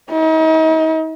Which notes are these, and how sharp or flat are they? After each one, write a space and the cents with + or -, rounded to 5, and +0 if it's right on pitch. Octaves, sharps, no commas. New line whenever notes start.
D#4 +40